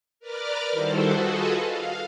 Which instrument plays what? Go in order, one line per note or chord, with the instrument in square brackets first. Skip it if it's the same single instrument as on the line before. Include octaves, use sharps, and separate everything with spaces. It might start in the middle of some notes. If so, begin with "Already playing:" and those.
[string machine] A#4 B4 D5 D6 F6
D#3 G3 E4 F#4 A4 C5
F4 F#4 G#4 A4 B4 D#5
F5